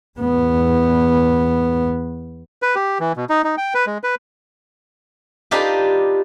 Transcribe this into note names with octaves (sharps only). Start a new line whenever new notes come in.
E2 B3
B4
G4
E3
B2
D#4
D#4
G5
B4
G#3
B4
D4 D#4 F4 G4 B4